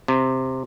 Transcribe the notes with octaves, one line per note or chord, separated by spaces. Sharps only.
C3